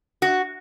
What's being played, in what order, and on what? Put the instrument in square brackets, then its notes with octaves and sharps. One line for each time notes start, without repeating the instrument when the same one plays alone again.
[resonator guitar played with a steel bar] F#4